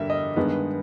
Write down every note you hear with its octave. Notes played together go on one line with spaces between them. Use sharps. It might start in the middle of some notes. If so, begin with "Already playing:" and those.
Already playing: G2 D3 G3 A#3 E5
D#5
G2 D#3 G#3 B3